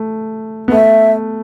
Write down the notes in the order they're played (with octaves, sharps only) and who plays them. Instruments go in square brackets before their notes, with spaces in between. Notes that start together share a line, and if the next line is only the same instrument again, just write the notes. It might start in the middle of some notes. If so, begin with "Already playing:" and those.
Already playing: [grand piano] A3
B3
[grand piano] A3 [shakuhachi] E5